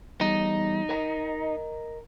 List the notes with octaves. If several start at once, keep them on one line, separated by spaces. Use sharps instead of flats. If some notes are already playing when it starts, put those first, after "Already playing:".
E2 G3 D#4
A#4 D#5 A#5